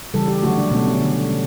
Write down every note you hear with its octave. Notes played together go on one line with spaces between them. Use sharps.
C#3 E3 G3 A4
G4
D3 F#3 A3 F#4
D4
B2 A3 C#4
C#4
D3 A3
A3 C#4